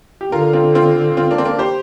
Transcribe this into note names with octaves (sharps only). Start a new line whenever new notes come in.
G4
D3 F4 A#4
C4 F4
C4 F4
C4 F4
A#3 D4
C4
A#3 D4
G4 C5